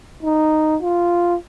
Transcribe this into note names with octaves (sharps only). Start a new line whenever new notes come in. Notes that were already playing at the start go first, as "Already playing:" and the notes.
D#4
F4